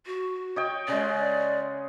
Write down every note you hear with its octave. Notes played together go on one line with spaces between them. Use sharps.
F#4
C#5 D#5 G5
C#3 G#3 D5